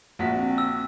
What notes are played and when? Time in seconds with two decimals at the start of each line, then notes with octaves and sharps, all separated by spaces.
0.19 A#1 F#4 B6
0.33 C4
0.58 E6